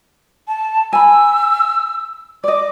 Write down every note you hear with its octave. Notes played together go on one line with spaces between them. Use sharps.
A5
G#5 B5 E6
D5 D#5 D6